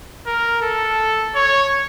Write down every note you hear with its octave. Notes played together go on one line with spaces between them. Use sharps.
A#4
A4
C#5